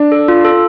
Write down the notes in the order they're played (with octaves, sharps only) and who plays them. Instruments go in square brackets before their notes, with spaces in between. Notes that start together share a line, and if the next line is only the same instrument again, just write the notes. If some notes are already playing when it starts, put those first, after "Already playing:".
Already playing: [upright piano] D4
[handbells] A4
F4
A4